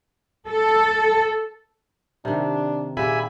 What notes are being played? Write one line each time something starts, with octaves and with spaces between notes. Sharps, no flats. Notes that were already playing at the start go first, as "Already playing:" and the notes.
A4
C3 D#3 D4
A#2 G4 G#4 E5 G#5 B5